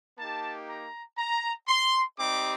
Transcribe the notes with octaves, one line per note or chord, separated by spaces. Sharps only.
A#3 D#4 G4 A5
A#5
A#5
C6
G3 C4 D#4 G4 D6